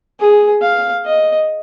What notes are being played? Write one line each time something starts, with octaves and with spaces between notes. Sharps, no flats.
G#4
F5
D#5